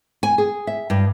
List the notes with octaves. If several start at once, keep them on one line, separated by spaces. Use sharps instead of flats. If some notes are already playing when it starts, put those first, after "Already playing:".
G#5
G#4
E5
G2